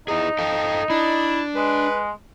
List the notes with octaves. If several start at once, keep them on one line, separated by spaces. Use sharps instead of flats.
D#4 E4 G#4
A4 F5 G5
D4 E4
G#3 B4